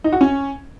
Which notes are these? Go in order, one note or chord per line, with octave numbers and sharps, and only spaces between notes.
D#4
F#4
C#4